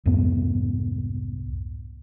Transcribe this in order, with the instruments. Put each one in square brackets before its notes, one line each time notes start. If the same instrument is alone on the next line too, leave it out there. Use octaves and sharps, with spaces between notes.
[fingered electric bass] C2 F2 G#2 B3